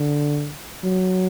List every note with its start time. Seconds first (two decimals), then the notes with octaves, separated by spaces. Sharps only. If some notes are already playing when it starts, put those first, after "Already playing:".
Already playing: D3
0.84 F#3